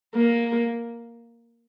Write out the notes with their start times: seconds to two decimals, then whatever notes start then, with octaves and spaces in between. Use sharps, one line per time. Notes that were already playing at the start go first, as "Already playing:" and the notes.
0.15 A#3